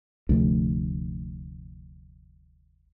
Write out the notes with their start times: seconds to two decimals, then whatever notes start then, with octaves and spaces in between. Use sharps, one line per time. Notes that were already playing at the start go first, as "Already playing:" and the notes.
0.29 F1 D2